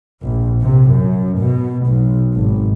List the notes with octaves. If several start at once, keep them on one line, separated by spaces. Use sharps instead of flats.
A#1
C3
F#2
B2
B1
G#1